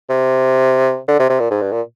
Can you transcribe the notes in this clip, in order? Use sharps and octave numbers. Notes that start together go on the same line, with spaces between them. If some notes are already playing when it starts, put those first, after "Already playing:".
C3
D3
C3
C3
A#2
G#2
G2
A#2